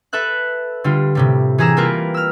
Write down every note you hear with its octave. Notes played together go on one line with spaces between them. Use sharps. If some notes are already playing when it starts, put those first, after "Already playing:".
A4 B4 E5 F#6
D3 G3 F4
A2 C3 G3
E3 G4 G#4 A#5 E6 E7
G3 A#3 F4 A#4 B4
E6 F6